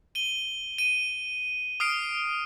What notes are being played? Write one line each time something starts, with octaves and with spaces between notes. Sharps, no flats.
D#7 G7
D#7
D#6 F6 C7 D7